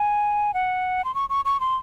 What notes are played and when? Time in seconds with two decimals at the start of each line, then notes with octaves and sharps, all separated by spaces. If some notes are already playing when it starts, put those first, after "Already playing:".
Already playing: G#5
0.54 F#5
1.05 C6
1.15 C#6
1.30 C#6
1.45 C#6
1.60 C6